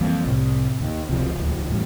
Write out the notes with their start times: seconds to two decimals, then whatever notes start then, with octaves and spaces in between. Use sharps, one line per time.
0.01 F2 E3 G3 A#3
0.26 C2 A2 C3
0.81 D#2
1.10 E1 C#2 C3 F3
1.35 D1 D#2
1.70 E2 A2 E3 G3